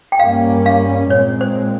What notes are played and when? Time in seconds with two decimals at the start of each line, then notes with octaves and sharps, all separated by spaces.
0.12 G5
0.19 G2 G3 A#3 C#4 F5
0.66 F5
1.10 A#2 G#3 C4 C#5
1.41 C5